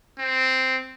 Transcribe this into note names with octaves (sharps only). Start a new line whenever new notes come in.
C4